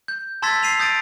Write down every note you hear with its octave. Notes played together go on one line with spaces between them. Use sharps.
G6
A5 C6 E6 G#6 A6 B6
C7 D#7 F7
D#6 G6 A6 D7 D#7